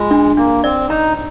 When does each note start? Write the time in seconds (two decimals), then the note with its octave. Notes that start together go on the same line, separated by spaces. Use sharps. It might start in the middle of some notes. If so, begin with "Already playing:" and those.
Already playing: G#3 F4
0.11 D4
0.37 A#3 D4
0.63 C4 D5
0.90 D#4 A#5